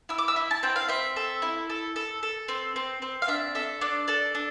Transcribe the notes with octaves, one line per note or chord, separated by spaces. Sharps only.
E4 E6
D6
E6
E4
A5
C4 G5
F5
C4 E5
A4
E4
A4
A4
A4
C4
C4
C4
F5
D4 E5
A4 E5
D4 D5
A4 D5
D4